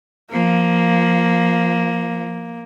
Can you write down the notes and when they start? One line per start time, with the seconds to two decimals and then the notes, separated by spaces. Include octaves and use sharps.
0.32 F3 A#3